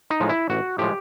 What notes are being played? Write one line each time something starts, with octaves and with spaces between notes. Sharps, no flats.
D#4
A2 F3 G#3
E4
A1 F#4
A2 F3 G#3 G4